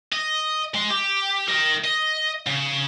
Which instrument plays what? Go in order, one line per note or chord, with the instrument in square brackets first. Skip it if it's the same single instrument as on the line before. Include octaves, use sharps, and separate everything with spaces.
[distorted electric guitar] D#5
G#3 C6
G4
A#4 D#5
D#5
C#3